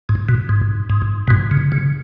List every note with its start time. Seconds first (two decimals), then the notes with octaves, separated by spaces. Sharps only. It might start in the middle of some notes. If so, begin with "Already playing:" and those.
0.09 G#2
0.29 B2
0.49 G#2
0.90 G#2
1.28 B2
1.30 G#2
1.51 C#3
1.72 C#3